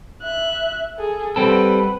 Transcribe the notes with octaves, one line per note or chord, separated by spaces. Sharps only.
E5 F#6
G#4 A4
G3 C4 A4 B4 F#5